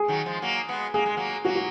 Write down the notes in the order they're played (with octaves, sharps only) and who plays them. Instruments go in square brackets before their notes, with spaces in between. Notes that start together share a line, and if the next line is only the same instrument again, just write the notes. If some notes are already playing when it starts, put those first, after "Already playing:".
Already playing: [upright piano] G#4
[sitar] D#3 F#3
F3 G#3
F#3 A#3
G#3 B3
[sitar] A#3 [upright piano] G#4
[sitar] G#3
F#3 A#3
[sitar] F#3 A#3 [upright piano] F#4
[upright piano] F#4